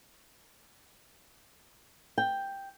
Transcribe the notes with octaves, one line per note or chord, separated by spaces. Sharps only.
G5